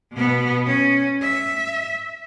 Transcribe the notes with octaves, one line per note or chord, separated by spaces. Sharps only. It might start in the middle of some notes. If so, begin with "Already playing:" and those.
B2 B3
C#4
E5